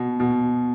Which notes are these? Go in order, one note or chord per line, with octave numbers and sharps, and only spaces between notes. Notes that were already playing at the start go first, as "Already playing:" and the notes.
Already playing: B2
B2